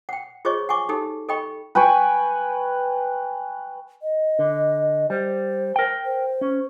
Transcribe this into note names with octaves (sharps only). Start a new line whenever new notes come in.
F#5 G5
F4 G#4 C5 C#5 D#5 C#6
F#5 G#5 C#6 D6
D#4 G4 A4
A4 D#5 G5 B5 C#6
B4 G5 G#5 C#6
D#5
D3
G3 C5
A#4 G5
C5
C#4